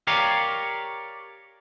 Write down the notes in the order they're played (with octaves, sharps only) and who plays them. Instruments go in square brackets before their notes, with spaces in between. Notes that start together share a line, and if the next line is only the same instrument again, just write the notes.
[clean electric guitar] G4 A#4 C#5 D5 F5